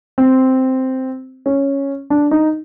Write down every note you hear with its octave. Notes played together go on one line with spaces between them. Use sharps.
C4
C#4
D4
D#4